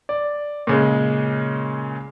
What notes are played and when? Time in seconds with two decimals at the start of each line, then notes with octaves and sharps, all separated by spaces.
0.09 D5
0.67 A#2 C#3 G#3